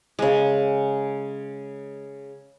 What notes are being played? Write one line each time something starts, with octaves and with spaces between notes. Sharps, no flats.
C#3 G#3